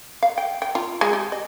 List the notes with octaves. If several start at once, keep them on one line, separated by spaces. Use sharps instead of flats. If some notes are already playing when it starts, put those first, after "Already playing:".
F5
G5
G5
F4
G#3
G4
D#5